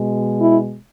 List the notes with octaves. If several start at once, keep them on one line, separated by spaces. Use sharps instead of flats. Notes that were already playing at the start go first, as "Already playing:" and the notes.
Already playing: B2 G#3
E4